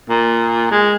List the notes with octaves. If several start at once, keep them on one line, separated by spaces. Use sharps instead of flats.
A#2
G#3